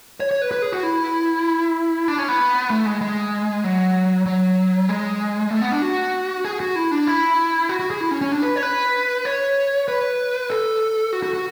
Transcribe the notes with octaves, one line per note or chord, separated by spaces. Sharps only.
C#5
C#5
B4
B4
G#4
F#4
E4
D4
C#4
B3
A3
G#3
G#3
F#3
F#3
G#3
A3
B3
D4
F#4
G#4
F#4
E4
D4
E4
F#4
F#4
G#4
E4
C#4
C#4
D4
B4
C#5
B4
C#5
B4
A4
F#4
F#4
F#4